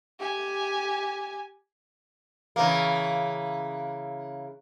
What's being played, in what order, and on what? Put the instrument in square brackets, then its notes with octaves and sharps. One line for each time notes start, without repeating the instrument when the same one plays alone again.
[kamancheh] G4 G#5
[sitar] C#3 E3 A#3